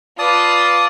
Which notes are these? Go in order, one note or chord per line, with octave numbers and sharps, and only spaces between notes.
F4 B4 D5 A5 D#6